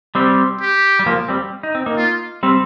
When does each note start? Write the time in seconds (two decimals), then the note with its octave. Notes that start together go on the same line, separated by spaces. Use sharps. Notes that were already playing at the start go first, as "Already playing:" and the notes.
0.15 G3 C4
0.61 G4
0.99 G3
1.06 F3 A#3
1.29 G3 C4
1.63 D#4
1.75 C4
1.86 A#3 D#4
1.97 F4
2.43 G3 C4